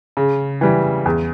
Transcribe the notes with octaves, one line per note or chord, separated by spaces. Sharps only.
C#3
E3 G3
E2